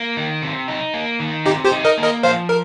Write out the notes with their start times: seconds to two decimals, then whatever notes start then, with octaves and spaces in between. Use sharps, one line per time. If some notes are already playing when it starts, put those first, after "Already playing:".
Already playing: A#3
0.17 D#3
0.42 C3
0.68 D#4
0.94 A#3
1.20 D#3
1.46 C3 D#4 G4
1.65 G4 C5
1.71 D#4
1.84 A#4 D#5
1.98 A#3
2.04 A#4 D#5
2.23 F3 C5 F5
2.49 A#4